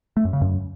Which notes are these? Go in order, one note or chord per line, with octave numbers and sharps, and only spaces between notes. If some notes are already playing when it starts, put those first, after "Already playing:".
A3
F#2
C#3
F#2